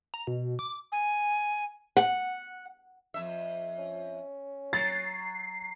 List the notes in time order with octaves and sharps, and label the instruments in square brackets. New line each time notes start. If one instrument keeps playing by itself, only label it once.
[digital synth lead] A#5
B2
D6
[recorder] G#5
[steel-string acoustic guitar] F#5
[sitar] F2 E5
[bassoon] C#4
[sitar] F#3 [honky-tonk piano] A6 [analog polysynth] C7